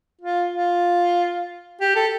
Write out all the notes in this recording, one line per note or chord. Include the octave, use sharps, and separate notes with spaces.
F4
F4
G4
A4